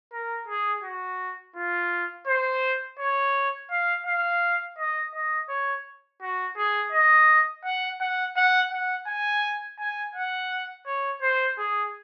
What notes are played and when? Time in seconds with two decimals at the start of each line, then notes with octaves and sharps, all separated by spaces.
0.13 A#4
0.48 G#4
0.83 F#4
1.56 F4
2.27 C5
2.99 C#5
3.71 F5
4.07 F5
4.78 D#5
5.14 D#5
5.49 C#5
6.22 F#4
6.57 G#4
6.92 D#5
7.65 F#5
8.01 F#5
8.37 F#5
8.72 F#5
9.08 G#5
9.80 G#5
10.15 F#5
10.87 C#5
11.22 C5
11.58 G#4